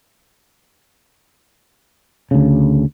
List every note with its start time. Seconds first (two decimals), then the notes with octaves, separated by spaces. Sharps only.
2.31 D2 C#3